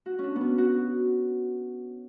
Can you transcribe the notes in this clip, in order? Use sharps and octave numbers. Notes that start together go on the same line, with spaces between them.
F#4
C#4 D4
B3
C#4
F#4